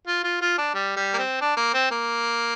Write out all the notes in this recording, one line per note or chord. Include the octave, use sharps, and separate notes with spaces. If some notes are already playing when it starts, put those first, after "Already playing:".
F4
F4
F4
D4
G3
G3
A#3
C4
D4
A#3
C4
A#3